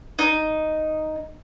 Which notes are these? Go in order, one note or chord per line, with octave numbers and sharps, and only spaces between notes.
D#4